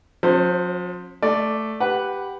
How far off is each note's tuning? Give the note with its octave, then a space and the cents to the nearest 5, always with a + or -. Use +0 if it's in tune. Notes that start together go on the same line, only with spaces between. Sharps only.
F3 +45 C#4 -35 C5 +0
A3 +0 D5 +0
G4 +0 B4 +0 F#5 +10